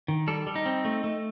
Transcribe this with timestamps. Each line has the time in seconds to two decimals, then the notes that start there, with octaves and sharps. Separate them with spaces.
0.08 D#3
0.27 G3 A4
0.47 G3
0.55 D#4
0.66 C4
0.85 A3
1.04 A3